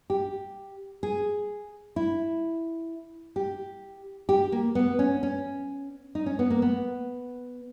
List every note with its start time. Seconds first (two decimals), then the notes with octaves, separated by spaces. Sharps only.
0.10 G4
1.03 G#4
1.96 E4
3.36 G4
4.29 G4
4.52 A#3
4.75 B3
4.99 C#4
5.23 C#4
6.15 D#4
6.26 C#4
6.39 B3
6.50 A#3
6.62 B3